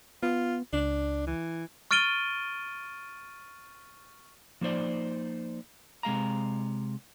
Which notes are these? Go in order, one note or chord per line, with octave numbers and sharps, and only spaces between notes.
B3 F4
C#2 D4
E3
C#6 F6 A6 D7 D#7 G7
F3 A#3 D#4 C5 D5
C3 G#3 F5 A#5